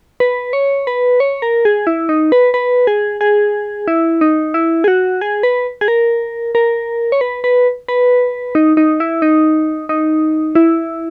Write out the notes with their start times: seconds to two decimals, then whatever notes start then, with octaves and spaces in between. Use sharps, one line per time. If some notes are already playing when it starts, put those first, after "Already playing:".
0.20 B4
0.53 C#5
0.87 B4
1.20 C#5
1.42 A#4
1.65 G#4
1.87 E4
2.09 D#4
2.32 B4
2.54 B4
2.87 G#4
3.21 G#4
3.88 E4
4.21 D#4
4.54 E4
4.84 G#4
4.88 F#4
5.21 G#4
5.43 B4
5.81 G#4
5.88 A#4
6.55 A#4
7.12 C#5
7.21 B4
7.44 B4
7.88 B4
8.55 D#4
8.77 D#4
9.00 E4
9.22 D#4
9.89 D#4
10.55 E4